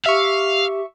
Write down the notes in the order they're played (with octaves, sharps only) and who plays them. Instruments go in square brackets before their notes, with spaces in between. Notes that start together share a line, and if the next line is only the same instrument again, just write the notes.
[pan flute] G4 [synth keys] E5 C#6 [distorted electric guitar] F5